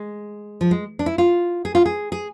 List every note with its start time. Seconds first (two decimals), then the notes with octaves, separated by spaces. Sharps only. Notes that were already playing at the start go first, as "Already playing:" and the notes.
Already playing: G#3
0.61 F3
0.71 G#3
0.99 D4
1.06 E4
1.18 F4
1.65 G#4
1.75 F4
1.86 G#4
2.12 G#4